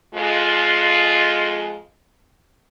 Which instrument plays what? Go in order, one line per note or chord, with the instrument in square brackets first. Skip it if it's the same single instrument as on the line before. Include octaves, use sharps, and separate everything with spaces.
[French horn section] F2 G#3 F4